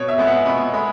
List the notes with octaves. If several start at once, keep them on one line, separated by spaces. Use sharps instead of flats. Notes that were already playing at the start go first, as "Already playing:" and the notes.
Already playing: B2 C#5
E5
G#3 B3
F#5
B2 B5
G#3 B5